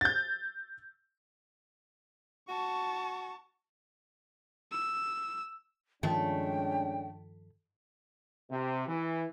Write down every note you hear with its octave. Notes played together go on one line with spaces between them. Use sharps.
G6 A6
F#4 A5 C#6
E6
G2 D#3 F3 G#3 A3 C#4 D4 G5
C3
E3